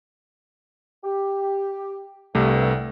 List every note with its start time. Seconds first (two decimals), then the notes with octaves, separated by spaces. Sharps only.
1.03 G4
2.35 C2 G2 C3 A3